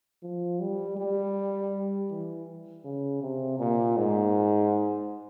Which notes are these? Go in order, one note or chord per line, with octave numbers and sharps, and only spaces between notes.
F3
G3
G3
E3
C#3
C3
A#2
G#2